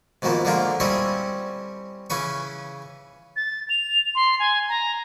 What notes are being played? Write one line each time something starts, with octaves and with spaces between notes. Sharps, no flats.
G#2 B2 D#3 F3 A#3 B3
D3 F3 G#3 A#3 F4 A#4
G3 C4 C#4 E4 C#5 D#5
C#3 E3 C#4 B4 C#6
A6
F7
C6
G#5
A#5